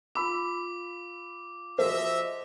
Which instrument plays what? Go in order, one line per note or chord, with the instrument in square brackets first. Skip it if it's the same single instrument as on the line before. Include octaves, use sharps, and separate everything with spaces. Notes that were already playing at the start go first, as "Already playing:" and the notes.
[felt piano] F4 B5 E6 [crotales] D6
[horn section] F3 D#5 E5 [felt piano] F#4 G#4 A4 [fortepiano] C5